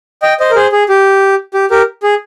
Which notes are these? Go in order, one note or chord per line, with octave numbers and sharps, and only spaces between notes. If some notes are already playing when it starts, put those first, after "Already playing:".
D#5 G5
C5 D#5
A#4
G#4 C5
G#4
G4
G4
G4 A#4
G#4